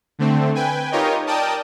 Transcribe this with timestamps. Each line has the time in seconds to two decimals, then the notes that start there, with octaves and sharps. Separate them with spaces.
0.19 D3 A3 C4
0.55 B4 G5 G#5
0.91 D#4 F4 G4 A#4 C#5 D#5
1.27 A#4 D5 G5 A5 D#6